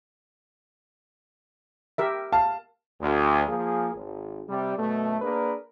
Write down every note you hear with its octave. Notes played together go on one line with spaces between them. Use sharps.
G4 A#4 E5
F5 A5
D2
F3 A#3 F4 G#4
G#1
C3 G3
F#2 B2 A3
A#3 D4 G#4 A#4 B4